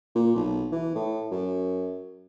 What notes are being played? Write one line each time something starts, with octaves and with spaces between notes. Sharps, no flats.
A#2
B1
E3
A2
F#2